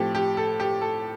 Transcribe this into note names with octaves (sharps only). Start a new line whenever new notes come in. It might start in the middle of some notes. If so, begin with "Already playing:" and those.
Already playing: A2 F3 A3 C4 G4 A4
G4
A4
G4
A4